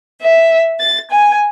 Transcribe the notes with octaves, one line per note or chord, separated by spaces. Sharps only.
E5
A6
G#5